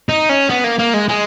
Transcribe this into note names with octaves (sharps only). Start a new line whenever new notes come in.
D#4
C#4
B3
A#3
A#3
G#3
G#3